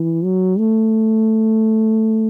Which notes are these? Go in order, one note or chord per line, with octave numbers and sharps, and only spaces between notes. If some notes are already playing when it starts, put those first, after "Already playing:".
Already playing: E3
F#3
A3